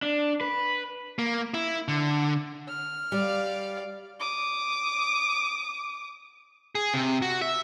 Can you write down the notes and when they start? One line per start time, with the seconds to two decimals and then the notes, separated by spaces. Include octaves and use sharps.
0.02 D4
0.41 B4
1.19 A#3
1.54 E4
1.88 D3
2.68 F6
3.12 G3 D5 F5
4.20 D6 D#6
6.75 G#4
6.94 C3
7.22 F#4
7.42 E5